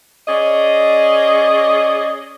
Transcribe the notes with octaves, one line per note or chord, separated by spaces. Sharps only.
C#4 G#4 D5 D#5